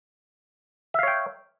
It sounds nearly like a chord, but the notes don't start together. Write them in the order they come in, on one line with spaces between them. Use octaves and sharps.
E5 F5 C#5 G5